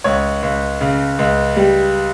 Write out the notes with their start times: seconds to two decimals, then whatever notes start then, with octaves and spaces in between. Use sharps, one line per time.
0.04 C#2 C#5
0.42 C#2
0.81 C#3
1.19 C#2
1.57 G3